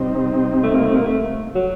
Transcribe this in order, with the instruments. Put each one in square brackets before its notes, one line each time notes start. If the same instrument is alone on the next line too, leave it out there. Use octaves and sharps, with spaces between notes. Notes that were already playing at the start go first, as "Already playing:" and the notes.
Already playing: [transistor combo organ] C3 G3 C4 D#4
[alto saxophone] A3
A#3
A3
A#3
A3
F#3